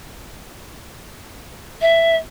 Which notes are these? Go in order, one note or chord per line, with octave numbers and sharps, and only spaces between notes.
E5